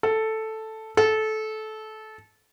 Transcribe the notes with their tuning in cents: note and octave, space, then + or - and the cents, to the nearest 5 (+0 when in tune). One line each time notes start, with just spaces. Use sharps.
A4 +0
A4 -20